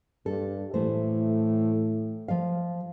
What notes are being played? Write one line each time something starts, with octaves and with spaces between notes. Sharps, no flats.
G2 A4
A2 E3 A3 C5
F3 F5